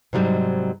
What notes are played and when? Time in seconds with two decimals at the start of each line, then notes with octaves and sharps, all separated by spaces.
0.13 G#2 C3 F#3 G3 D#4